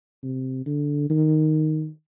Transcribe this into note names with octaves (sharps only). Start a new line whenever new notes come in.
C3
D3
D#3